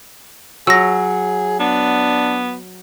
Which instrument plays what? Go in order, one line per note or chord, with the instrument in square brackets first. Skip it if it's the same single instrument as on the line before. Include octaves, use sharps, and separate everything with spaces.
[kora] F#3 [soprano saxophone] G#4 [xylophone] E6 A#6
[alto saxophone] B3 [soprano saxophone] D4